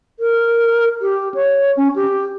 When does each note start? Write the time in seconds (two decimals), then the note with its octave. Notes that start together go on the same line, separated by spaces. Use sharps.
0.20 A#4
1.02 G4
1.34 C#5
1.77 C#4
1.96 G4